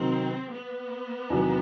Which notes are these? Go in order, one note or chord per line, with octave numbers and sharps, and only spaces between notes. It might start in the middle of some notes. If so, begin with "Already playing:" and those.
Already playing: C3 D#3 F#3 C4
B3
E2 C3 D#3 F#3